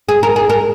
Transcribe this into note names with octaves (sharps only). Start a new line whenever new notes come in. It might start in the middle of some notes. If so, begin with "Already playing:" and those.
G#4
A#4
G#4
A#4